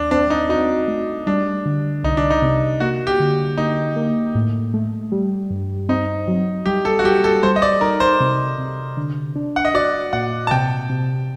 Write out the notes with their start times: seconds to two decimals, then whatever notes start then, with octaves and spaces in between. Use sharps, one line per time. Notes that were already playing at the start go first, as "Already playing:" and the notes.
Already playing: D#2 D4
0.11 C4 D4
0.30 D#4
0.49 D#4 F#4
0.88 A3
1.27 G3 D4
1.66 D3
2.04 C2 D#4
2.17 D4
2.30 D#4
2.42 C3
2.80 A#3 F#4
3.07 G4
3.20 D3
3.58 A#3 D#4
3.96 A#3
4.35 A2
4.74 A3
5.12 G3
5.50 G2
5.89 C4 D#4
6.28 F#3
6.66 G3 G4
6.85 A4
6.99 F#4
7.04 G3 G4
7.24 A4
7.43 G3 C5
7.56 D#5
7.62 D5
7.81 D#4 A#4
8.00 C5
8.20 C3
8.58 C3
8.97 D3
9.36 D4
9.56 F#5
9.65 D#5
9.74 F#4 D5
10.13 A#2 F#5
10.47 A5
10.51 C3 G5
10.90 C3